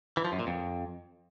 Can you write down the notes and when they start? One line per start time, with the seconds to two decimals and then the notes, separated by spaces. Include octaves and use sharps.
0.17 E3
0.25 F3
0.32 F#2
0.39 A#2
0.47 F2